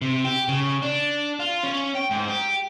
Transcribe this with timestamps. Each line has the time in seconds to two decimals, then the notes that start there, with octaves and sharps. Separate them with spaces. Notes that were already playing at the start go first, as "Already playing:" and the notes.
0.02 C3
0.25 G4
0.48 C#3
0.82 D4
1.40 F4
1.64 C#4
1.95 G5
2.11 G#2
2.28 G4